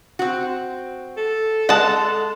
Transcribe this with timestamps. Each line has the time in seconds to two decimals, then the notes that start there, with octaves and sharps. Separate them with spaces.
0.19 C4 F#4
1.17 A4
1.69 G#3 F#5 A5